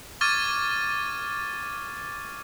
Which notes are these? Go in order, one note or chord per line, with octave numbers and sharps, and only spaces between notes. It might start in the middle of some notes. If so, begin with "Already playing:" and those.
C#6 D6 F6 G#6 A6 D#7